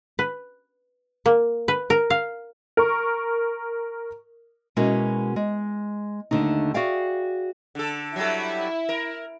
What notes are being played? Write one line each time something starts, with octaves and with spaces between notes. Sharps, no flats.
B4
A#3
B4
A#4
F5
A#4 C#6
B2 G#3 C#4 E4 F#4 A#4
G#3
D#2 D3 A3 D#4
F#4 G#4 D5 E5 F5 G5
D3 A4
F#3 G3 E4 A4
A#4